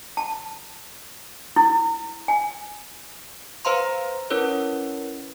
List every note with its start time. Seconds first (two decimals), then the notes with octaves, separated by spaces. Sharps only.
0.17 A5
1.56 E4
2.28 G#5
3.65 B4 C5 F5 A#5 C6
4.30 C#4 E4 A#4 B4 C#5